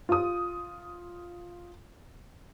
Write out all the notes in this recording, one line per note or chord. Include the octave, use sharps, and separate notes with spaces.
F4 D#6